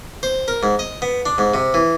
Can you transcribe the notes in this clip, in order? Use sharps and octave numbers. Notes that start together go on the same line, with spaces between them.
C5
A#4
G#2
D#5
B3
D4
G#2
C3
E3